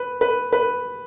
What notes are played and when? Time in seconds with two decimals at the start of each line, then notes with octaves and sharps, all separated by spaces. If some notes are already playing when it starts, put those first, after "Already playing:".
Already playing: B4
0.21 B4
0.53 B4